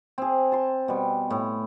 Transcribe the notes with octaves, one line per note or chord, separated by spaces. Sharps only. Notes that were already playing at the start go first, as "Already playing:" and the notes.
C4 G#4
A5 C6
B2 G3
A2